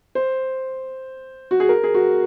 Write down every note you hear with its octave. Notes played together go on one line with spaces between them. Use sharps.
C5
F#4
G#4
A#4
G#4
F#4